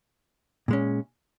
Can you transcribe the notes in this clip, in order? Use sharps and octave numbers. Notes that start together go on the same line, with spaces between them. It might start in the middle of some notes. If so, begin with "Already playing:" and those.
A#2 G#3 C#4